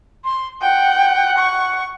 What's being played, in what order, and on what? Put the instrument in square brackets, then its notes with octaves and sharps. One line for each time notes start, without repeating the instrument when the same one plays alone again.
[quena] C6
[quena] F#5 [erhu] G5
[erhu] C#6